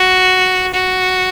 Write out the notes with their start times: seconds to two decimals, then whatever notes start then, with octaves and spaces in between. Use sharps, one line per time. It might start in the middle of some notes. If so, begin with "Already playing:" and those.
Already playing: F#4
0.73 F#4